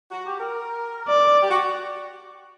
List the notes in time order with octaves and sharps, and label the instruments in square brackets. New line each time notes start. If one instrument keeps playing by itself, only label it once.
[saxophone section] F#4
G4
A#4
[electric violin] D5
[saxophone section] G4
F#4